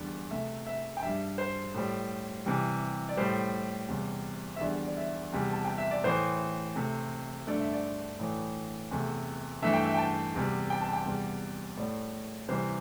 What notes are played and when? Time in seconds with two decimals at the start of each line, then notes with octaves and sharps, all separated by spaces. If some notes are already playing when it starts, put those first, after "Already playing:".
Already playing: E2 D3 G3
0.31 C3 A3 E5
0.66 E5
0.97 G5
1.03 G2 G3 E5
1.38 C5
1.74 A2 G3
2.46 C3 E3 G3
3.09 D5
3.17 A2 G3 C5
3.89 E2 C3 G3
4.56 E5
4.60 E2 D3 G3 D5
4.85 D5
4.97 E5
5.32 E2 C3 G3
5.52 A5
5.65 G5
5.78 E5
5.91 D5
6.04 A2 E3 A3 C5
6.76 C3 A3
7.47 G2 D3 A3 D5
7.60 E5
7.73 D5
8.19 A2 E3 A3
8.91 E2 C3 A3
9.62 G2 E3 A3 E5
9.73 G5
9.85 E5
9.94 G5
9.98 A5
10.34 E2 C3 G3
10.70 G5
10.81 A5
10.93 G5
11.05 E2 C3 G3
11.77 A2 A3 D5
12.48 C3 E3 G3 C5